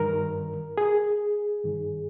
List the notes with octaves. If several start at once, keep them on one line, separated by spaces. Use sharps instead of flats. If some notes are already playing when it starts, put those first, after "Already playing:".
Already playing: G2 D#3 A#4
G#4
G2 D#3